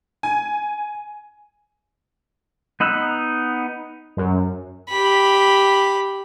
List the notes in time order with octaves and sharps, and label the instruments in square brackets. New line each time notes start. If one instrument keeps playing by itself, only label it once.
[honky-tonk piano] G#5
[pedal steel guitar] B3 D#4 B5 E6 F#6
[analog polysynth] F#2
[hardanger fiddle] G4 B5